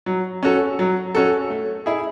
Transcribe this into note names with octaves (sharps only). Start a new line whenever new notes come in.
F#3
C#4 F#4 A4
F#3
C#4 F#4 A4
A3
E4 G#4